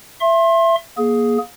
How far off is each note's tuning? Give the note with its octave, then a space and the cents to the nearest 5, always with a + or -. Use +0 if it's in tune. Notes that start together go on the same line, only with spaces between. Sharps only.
E5 +20 C6 +30
A#3 +25 G#4 +10